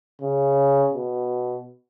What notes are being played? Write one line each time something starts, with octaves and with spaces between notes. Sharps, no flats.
C#3
B2